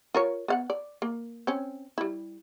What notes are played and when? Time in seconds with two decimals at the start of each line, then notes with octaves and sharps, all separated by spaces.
0.15 F4 A#4 C#5
0.48 B3 F5 F#5
0.70 D5
1.02 A#3
1.47 C4 C#4
1.98 G3 E4